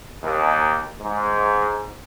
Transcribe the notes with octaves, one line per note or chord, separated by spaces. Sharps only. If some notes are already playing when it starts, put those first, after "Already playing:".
D#2
G#2